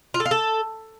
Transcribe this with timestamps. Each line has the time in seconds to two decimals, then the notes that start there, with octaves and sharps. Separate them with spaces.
0.14 F4
0.20 A4
0.25 F4
0.31 A4